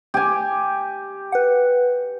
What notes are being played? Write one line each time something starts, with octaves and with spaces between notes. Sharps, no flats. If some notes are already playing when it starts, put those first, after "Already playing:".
G4 G#5
B4 F#5